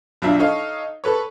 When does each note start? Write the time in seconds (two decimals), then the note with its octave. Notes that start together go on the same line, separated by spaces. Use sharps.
0.22 B1 F#3 D4 F4 E5
0.39 D#4 A4 C#5 F5
1.04 A4 B4 C#5